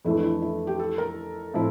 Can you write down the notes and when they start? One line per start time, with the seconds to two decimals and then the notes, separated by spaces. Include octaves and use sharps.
0.05 F2 E3 A3 D4 E4
0.24 E4
0.42 E4
0.67 G4
0.79 A4
0.98 A#4
1.54 A2 F3 C4 E4